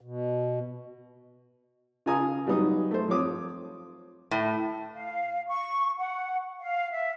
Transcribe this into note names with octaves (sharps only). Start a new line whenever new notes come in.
B2
C#3 F4 G#5 A#5 D#6
F#3 G3 B3 D#4 D#6
A3 C5
F3 C4 C#5 D6 D#6
A2
F5
C#6
F#5
F5
E5